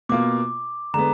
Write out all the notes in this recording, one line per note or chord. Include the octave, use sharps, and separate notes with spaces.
B2 A#3 F4 D6
D3 G#3 B3 A#5